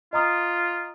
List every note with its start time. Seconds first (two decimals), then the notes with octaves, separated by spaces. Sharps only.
0.13 F4 D#5 A#5 D#6